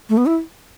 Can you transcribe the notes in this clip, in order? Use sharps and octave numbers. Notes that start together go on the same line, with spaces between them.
A3
B3
E4